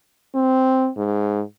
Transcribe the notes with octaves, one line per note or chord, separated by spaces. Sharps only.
C4
G#2